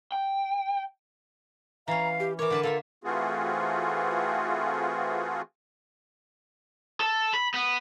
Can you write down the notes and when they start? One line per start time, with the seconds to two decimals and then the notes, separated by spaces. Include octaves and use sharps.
0.12 G5
1.88 E3 C#4 F5 A#5
2.20 G4
2.39 E3 A#4 C#5 D6
2.50 D3 B4 A5
2.63 A#3 F4 A4 E5
3.04 E3 A3 C4 F4 F#4 G#4
7.01 A4
7.34 B5
7.54 B3